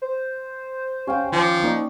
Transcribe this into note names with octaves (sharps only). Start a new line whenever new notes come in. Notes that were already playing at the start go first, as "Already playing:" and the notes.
C5
C#4 G4 F5 G5
D#3 F3 D6
A#3 D#4 D5